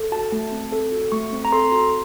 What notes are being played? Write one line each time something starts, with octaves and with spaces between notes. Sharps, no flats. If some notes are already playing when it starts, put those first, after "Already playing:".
Already playing: A4
F#4 A5
A3 A5
C4
A4
F#4
A3 C#6
C4
A#5
A4 C6
F#4